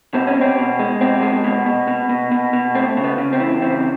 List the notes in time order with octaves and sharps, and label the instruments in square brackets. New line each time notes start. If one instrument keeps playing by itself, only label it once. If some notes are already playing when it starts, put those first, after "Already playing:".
[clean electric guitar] B2 C4
C#4
B2
C4
B2
G#3
B2 C4
G#3
B2
B2
B2
B2
B2
B2
A3 C4
C#3
B3
C#3
C4
E3
C#3 C4